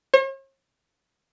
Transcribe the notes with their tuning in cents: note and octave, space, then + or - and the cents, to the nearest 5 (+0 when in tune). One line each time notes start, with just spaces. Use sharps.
C#5 -45